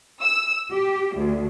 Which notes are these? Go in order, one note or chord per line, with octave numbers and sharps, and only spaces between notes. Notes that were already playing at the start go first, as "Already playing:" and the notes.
E6
G4
D2